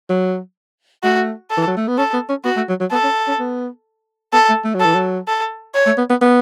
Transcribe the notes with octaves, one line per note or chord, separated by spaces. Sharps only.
F#3
A3 F#4
A4
E3
F#3
A3
B3
C#4 A4
B3
C#4
B3 F#4
A3
F#3
F#3
B3 A4
C#4
C#4
B3
B3 A4
A3
A3
F#3
A4
E3
F#3
A4
C#5
A3
B3
B3
B3